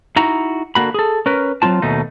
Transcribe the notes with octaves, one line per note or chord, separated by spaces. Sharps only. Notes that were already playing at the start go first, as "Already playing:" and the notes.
D#4 E4 F#4 A#5
D3 A#3 F#4 B5
G#4 A4
C#4 A#4 B4
F#3 A#3 C4 F4 A5
D#2 B2 A3 D#4